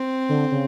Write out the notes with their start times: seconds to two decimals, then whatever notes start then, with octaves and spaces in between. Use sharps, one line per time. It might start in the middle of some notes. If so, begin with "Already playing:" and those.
Already playing: C4
0.29 D3
0.52 C#3